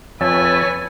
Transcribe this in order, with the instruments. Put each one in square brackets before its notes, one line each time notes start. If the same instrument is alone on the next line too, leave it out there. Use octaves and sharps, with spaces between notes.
[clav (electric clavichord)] F2 [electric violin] B4 G#5 [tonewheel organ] C#5 A5 [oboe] E5